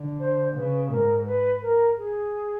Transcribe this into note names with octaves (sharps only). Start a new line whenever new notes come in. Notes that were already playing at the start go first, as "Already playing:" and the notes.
Already playing: D3
C5
C#3 B4
G#2 A#4
B4
A#4
G#4